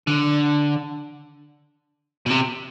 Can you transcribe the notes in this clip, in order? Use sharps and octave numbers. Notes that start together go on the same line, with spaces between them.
D3
B2
C3